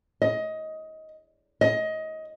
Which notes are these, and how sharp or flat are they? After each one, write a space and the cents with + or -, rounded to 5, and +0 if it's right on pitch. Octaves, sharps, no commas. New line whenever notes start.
D#5 +20
D#5 +20